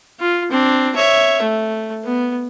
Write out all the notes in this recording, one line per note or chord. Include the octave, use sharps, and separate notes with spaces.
F4
C4 D4
C#5 E5
A3
B3